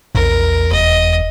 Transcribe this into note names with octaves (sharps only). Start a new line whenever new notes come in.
A#1 E2 A#4
F1 D#5